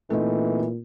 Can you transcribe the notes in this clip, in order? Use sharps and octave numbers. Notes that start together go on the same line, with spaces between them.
A#2 E3 A3 C4 D#4